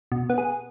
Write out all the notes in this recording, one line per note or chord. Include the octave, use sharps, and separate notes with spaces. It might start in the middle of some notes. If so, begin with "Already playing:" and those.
B2
B3
G#4